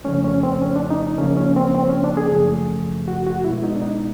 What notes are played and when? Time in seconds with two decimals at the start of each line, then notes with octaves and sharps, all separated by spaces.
0.04 F2 C#3 F3 A3 C#4
0.24 C#4
0.43 C4
0.62 C#4
0.76 D4
0.90 D#4
1.18 C#3 F3 A#3 C#4
1.37 C#4
1.56 C4
1.75 C4
1.89 C#4
2.04 D4
2.17 G#4
2.32 F#2 C#3 F3 A3
3.08 F#4
3.27 F#4
3.44 B2 G#3 B3 E4
3.63 D#4
3.75 D4
3.82 D#4